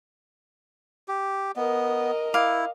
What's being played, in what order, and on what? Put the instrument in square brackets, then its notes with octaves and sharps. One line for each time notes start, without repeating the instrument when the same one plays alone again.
[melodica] G4
[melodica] B3 [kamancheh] A#4 D#5
[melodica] E4 [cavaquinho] F5 D6